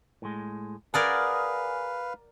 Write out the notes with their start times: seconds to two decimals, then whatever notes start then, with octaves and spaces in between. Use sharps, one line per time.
0.22 A2 G#3
0.94 G#4 A#4 B4 D5 F5 F#5